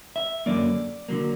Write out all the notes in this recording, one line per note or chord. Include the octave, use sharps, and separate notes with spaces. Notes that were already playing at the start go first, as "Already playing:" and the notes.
E5
F#2 D3 F#3 A#3 D5
D3 F#3 A#3